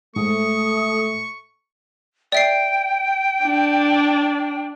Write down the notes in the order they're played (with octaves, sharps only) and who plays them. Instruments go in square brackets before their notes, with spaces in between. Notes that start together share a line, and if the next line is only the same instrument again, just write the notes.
[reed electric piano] G#2 [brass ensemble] A3 [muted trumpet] C#6 [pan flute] D#6
[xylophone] D5 E5 C7 [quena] G5
[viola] D4